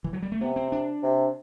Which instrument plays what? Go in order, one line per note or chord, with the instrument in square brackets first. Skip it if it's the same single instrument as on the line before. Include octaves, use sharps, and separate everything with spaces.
[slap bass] E3
F#3
G3
A3
[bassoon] C3 [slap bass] B3
[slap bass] C4
D4
[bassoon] C3